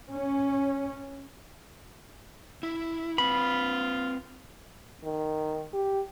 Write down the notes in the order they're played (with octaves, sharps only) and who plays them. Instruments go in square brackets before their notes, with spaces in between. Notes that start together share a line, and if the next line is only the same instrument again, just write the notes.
[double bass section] C#4
[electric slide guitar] E4
[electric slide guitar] C4 B4 [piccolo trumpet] F4 [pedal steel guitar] B5
[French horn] D#3
G4